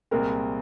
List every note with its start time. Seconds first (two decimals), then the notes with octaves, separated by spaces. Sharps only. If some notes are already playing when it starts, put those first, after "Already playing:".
0.11 C2 A#2 G#3 C4 A#4